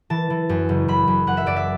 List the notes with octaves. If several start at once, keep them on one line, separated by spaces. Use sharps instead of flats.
E3 A5
E3
F#2
F#1
F#2 B5
F#2
F#2 F#5
E5
F#2 D5
E5